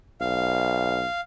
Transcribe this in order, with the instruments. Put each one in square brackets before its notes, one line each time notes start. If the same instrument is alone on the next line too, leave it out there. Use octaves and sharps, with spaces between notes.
[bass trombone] B1 [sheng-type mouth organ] F5